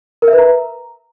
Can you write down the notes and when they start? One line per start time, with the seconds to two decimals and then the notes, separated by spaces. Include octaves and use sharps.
0.22 A#4
0.28 E5
0.33 B4
0.38 A#5